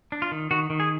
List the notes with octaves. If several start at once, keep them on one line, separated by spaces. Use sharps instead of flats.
D4
F4
D#3
D#3 F#4
D#3
G#4